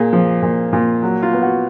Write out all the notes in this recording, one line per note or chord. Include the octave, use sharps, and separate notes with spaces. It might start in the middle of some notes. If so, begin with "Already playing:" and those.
Already playing: A#2 G#4
F3
A#2
A#2 F4
F#3
F4
B3
F#4